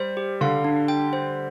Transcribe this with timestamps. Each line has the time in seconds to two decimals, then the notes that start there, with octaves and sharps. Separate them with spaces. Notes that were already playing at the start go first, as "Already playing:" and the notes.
Already playing: G3 C5
0.17 G4
0.41 D3 F5
0.64 D4
0.88 G5
1.13 C5